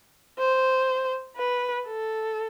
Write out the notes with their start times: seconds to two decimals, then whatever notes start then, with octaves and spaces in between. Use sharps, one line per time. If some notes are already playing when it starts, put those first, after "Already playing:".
0.39 C5
1.37 B4
1.87 A4